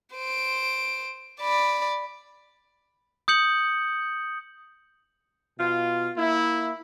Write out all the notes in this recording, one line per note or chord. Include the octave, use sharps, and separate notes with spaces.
C5 D7
D5 B5
D#6 G6 C#7 F#7
B2 F4
A#3 E4